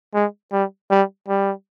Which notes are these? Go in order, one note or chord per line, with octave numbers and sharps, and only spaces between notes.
G#3
G3
G3
G3